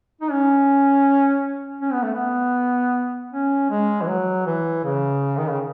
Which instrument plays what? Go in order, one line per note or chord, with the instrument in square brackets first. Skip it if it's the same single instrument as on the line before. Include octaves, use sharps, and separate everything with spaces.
[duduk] D#4
C#4
C#4
B3
A3
B3
C#4
G#3
E3
F#3
E3
C#3
D#3
C#3